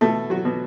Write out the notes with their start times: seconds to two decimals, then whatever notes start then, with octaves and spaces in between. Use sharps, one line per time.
0.01 B2 A3 A4
0.30 F#3 F#4
0.45 B2